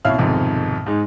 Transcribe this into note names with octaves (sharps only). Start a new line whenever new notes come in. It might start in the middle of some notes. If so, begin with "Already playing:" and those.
C2 B2 C#4 E4 F5 F6
B1 F2 G#2 C3 D#3
G#2 G#3 D#4